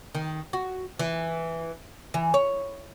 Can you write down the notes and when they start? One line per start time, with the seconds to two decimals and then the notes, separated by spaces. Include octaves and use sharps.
0.15 D#3
0.53 F#4
0.99 E3
2.14 E3
2.34 C#5